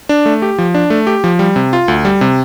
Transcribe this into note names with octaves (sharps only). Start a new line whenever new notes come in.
D4
A3
G4
F3
D4
A3
G4
F3
G3
C3
F4
D2
G3
C3